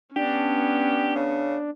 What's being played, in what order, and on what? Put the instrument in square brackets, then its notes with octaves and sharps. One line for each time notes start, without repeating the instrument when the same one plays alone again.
[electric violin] B3 C#4 [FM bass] D4 [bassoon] G4
[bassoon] C#3